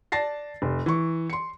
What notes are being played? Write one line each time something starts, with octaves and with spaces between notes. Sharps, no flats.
D5 A5 A6 A#6 C7
F1
E3 C#6
C6 C#7